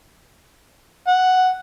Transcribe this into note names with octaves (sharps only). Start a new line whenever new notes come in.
F#5